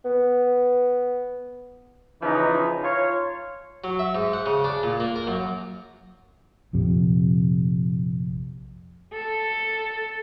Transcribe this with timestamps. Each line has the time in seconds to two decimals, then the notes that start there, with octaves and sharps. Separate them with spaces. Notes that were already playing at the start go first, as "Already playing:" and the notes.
0.05 B3
2.22 C#3 E3 F3 C#4 D#4
2.83 F4 C#5
3.84 F#3
3.99 E5
4.15 G#2
4.33 F#5
4.46 C#3
4.64 D4
4.83 A#2
5.00 A#3
5.16 A#4
5.27 F#2
6.73 A#1 F2 C3
9.13 A4